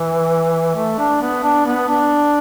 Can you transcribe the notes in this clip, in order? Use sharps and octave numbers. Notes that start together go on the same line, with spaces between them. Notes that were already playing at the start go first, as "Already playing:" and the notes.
Already playing: E3
A3
D4
B3
D4
B3
D4